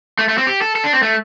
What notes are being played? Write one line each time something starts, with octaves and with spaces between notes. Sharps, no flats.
A3
A3
C4
G4
A4
A4
D4
C4
A3